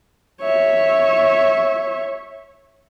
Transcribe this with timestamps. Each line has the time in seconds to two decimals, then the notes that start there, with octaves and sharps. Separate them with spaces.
0.41 C#5 E5